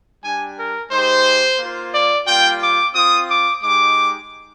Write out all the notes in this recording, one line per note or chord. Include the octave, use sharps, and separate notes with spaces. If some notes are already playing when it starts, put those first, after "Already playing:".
G3 D4 G4 G#5
A#4
G#3 D#4 G4 C5
A#3 F4
D5
G3 A#3 F4 G5
D6
C4 F4 D#6
D6
G#3 D#4 G4 D6